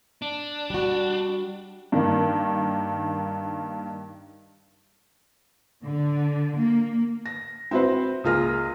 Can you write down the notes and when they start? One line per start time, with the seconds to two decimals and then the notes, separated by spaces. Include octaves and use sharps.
0.22 D4
0.70 G3 F#4
1.92 G2 D#3 A#3
5.83 D3
6.57 A#3
7.26 A#6
7.71 C4 E4 F#4 B4 C5
8.24 C#2 A#3 F4 G#4 F6 A#6